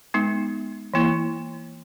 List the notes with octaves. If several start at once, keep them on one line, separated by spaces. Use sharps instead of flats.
G#3 B3 D#4
E3 A#3 E4